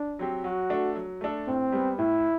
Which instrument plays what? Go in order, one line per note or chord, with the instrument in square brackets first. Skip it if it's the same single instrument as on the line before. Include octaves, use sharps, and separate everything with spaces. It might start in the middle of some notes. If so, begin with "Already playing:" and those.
Already playing: [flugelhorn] D4
[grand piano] F#3 C4 G4
[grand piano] F#3 [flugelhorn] F#4
[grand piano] A3 D4 A4
F#3
A3 D4 A4
[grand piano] A2 [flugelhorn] C4
[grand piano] G3 B3
[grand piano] A2 [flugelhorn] E4